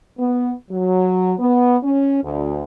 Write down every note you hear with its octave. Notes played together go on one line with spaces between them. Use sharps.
B3
F#3
B3
C#4
D2